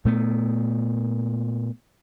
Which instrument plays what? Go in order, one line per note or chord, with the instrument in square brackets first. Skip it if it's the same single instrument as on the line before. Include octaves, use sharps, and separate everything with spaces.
[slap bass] A#2 A3 B3